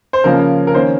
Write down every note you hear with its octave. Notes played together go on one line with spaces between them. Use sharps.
C5
C#3 F3 A#3 C#4 A#4
A#4
D#3 A#3 C#4 C5